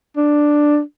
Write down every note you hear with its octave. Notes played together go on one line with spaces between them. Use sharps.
D4